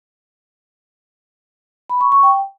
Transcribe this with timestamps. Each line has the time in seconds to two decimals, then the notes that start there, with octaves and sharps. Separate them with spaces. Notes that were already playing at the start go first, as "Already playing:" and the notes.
1.90 B5
2.01 C#6
2.12 C#6
2.23 G5